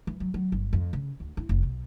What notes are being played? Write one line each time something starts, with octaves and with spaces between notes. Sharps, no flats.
E3
F#3
F#3
G1
F2
C#3
D2
E4
F1
B1